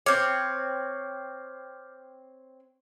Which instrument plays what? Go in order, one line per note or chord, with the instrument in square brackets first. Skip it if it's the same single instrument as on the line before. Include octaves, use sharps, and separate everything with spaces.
[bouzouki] C4 C#5 [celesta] D6 F6 G6